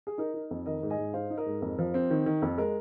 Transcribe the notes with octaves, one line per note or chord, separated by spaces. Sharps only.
G#4
D#4 A#4
D#4
F2
D#3 A#4 D#5
G#2
D#5 G#5
G#2
D#4 C5 F5
D#4
A#4 D#5
G#2
F2
F3
C4
D#3
D#3
F2
G#3 A#4